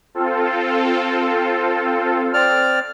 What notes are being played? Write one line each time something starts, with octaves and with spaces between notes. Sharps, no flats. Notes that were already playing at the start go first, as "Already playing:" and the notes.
C4 F4 A4
C4 D5 F6